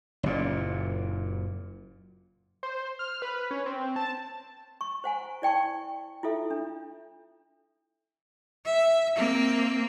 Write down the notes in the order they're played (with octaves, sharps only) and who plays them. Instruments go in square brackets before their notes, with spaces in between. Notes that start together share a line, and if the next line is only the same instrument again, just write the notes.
[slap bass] F#1 A#2
[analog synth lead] C5
F6
B4
C#4
C4
A5
[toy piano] C#6
C5 F#5 G#5 A#5
E4 D5 G5 A5 C#6
E4 F4 A4 E5
D4
[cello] E5
A#3 C4